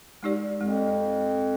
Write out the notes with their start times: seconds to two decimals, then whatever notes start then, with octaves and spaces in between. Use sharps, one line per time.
0.23 G#3 D#4 G4 D5
0.60 F2 G#3